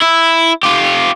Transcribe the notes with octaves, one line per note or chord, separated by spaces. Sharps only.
E4
F4 G4